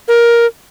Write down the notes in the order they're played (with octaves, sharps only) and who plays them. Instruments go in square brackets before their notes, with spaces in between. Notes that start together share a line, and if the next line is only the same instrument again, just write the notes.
[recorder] A#4